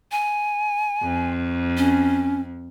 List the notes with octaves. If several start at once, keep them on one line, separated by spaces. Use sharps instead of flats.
G#5
F2
C#4